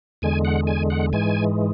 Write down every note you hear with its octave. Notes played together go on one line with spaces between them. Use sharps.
E2 D3 G#3 G#5
F#5
G#5
F#5
G#2 E3 G#3 G#5